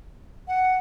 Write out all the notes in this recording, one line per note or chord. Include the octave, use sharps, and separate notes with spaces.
F#5